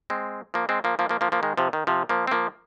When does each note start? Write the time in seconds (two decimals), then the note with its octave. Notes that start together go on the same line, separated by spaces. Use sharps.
0.10 G#3 C4
0.54 F3 A#3
0.69 G#3 C4
0.84 F3 A#3
0.99 F3 A#3
1.09 F3 A#3
1.21 F3 A#3
1.32 F3 A#3
1.43 D#3 G#3
1.57 C3 F3
1.73 D#3
1.87 C3 F3
2.09 F3 A#3
2.27 C4
2.31 F3 A#3